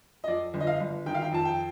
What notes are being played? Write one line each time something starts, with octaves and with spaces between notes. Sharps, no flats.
D#5
F2 D5
G1
D#5
F5
G1
D#3 G5
F5
G5
F2 A5
G5